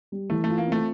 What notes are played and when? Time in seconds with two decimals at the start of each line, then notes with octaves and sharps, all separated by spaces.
0.12 G3
0.30 E3 A3
0.44 A3 F4
0.58 A#3
0.67 C4
0.72 A3